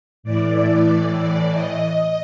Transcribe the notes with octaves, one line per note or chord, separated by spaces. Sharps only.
A2 E3 D5
D5
D#5